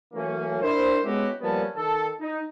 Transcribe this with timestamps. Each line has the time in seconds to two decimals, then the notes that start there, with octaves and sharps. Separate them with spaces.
0.14 E3 F#3 A3 A#3 C#4
0.60 D4 E4 A#4 C5
1.04 G#3 B3 C#4 E4 F#4 G4
1.41 F3 G3 A#3 B3 C#4 A5
1.75 D#3 A4
2.20 D#4